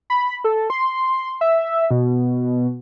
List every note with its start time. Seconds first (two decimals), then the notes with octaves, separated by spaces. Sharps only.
0.10 B5
0.44 A4
0.70 C6
1.41 E5
1.91 B2